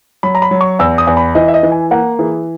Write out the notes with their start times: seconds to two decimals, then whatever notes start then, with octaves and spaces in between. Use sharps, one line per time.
0.23 F#3 B5
0.35 A#5
0.42 B5
0.51 F#3
0.61 C#6
0.79 E2 E6
0.98 D#6
1.07 E2
1.17 B5
1.35 E3 D#5
1.48 E5
1.54 D#5
1.63 E3
1.72 G#5
1.91 A#3 F#5
2.19 E3 G#4